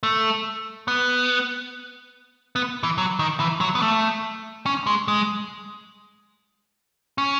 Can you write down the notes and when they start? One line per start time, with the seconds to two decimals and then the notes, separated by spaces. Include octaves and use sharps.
0.03 A3
0.88 B3
2.56 B3
2.83 E3
2.98 F#3
3.19 D#3
3.40 E3
3.61 F#3
3.75 B3
3.82 A3
4.66 C#4
4.87 G#3
5.08 G#3
7.18 C#4